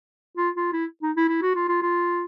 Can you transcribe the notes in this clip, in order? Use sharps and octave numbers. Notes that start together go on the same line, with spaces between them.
F4
F4
E4
D#4
E4
E4
F#4
F4
F4
F4